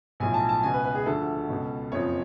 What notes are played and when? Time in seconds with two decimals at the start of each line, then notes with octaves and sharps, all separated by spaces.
0.20 B1 A2 F3 G#5
0.34 A5
0.49 A5
0.63 C#2 B2 G#5
0.74 B4
0.84 B4
0.95 G#4
1.06 D2 D3 F3 A4
1.49 C#2 B2
1.92 F#1 F2 F3 C#5